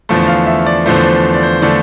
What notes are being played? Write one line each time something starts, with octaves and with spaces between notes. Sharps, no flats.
E2 D3 F3 A3
F5
E5
D5
E2 D3 F3 A3 C5
C5
D5
C5
D3 F3 A3 D5